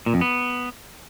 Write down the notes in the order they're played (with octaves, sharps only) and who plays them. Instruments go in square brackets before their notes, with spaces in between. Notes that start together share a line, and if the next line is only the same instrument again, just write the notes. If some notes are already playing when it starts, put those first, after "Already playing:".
[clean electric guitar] A#2
F2
B3